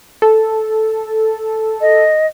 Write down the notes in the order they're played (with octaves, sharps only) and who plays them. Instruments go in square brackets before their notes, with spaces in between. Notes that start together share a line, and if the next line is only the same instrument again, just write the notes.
[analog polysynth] A4
[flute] D#5